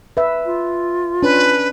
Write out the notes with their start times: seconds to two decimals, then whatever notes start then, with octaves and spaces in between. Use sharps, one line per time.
0.17 B4 E5
0.46 F4
1.22 C#4 D4 B4